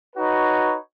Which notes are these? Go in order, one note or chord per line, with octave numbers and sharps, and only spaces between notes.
D#4 F#4 B4 C#5